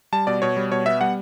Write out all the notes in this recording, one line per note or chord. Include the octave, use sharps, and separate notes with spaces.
G3 A5
B2 D5
B2 C#5
G3
B2 C#5
B3 E5
G3 F#5